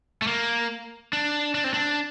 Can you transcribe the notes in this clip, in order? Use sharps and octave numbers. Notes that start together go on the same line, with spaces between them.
A3
A#3
D4
D4
C4
D4